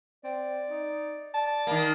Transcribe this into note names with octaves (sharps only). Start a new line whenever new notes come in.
C4 D5
D#4
D5 A5
D#3 A#3